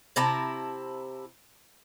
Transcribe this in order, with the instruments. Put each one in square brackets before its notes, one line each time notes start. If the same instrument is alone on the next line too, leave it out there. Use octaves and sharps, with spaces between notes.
[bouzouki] C3 E4 A5 A#5